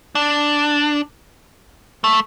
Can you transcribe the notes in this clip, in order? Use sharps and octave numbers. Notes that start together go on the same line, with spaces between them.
D4
A3